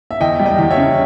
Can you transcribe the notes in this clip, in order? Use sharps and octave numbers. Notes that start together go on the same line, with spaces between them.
E5
E2 D#5 G5
G3
D#5 G5
E2
C#5 E5
C#3